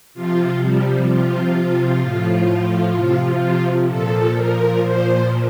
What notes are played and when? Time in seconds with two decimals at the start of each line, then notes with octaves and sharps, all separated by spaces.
0.14 C3 F3 F4
0.62 G3
1.08 C3 F3 F4
2.02 A2 F3
2.95 C3 F3
3.88 A#2 F3 A4
4.36 A#4
4.81 A#2 F3 C5